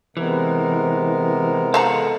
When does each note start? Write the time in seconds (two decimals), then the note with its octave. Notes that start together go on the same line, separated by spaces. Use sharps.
0.17 C3 E3 G#3 B3 A#4
1.74 A4 C5 F5 F#5 A#5